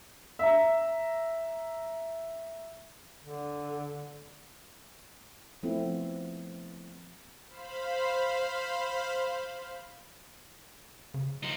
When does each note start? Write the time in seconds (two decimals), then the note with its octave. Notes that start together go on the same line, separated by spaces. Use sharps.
0.39 E5 A#5
3.25 D3
5.63 F3 A3 B3 C4 E4
7.48 C5 F5 B5
11.14 C#3
11.43 F3 D#4